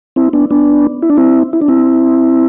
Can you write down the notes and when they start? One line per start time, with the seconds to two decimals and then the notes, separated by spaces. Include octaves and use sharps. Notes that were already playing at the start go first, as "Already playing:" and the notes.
0.16 C4 E4
0.33 B3 D4
0.51 B3 D4
1.02 E4
1.10 D4
1.17 C4 E4
1.53 E4
1.62 D4
1.68 C4 E4